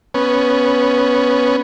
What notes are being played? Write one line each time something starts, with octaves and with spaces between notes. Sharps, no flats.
B3 C#4